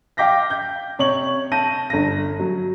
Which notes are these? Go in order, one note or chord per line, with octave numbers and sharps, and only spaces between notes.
F5 G5 D6 G6 A#6 B6
G6
C3 C#5 C#6 F#7
A5 G6 A#6 D#7
G1 A#6
F#3